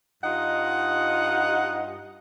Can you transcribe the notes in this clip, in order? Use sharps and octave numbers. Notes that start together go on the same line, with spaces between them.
G2 D#4 F4 D#5 F#5